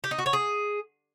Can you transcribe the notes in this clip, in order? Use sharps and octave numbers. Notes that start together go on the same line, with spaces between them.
G4
D#4
F#4
C#5
G#4